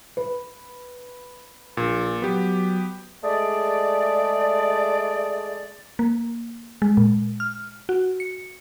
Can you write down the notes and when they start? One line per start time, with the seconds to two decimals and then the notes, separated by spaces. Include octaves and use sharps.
0.17 B4
1.77 A#1 A#2
2.22 F#3 B3 G4
3.24 G#3 A3 G#4 D5
5.99 A#3
6.82 G#3
6.97 A#2
7.40 F6
7.89 F#4
8.20 C#7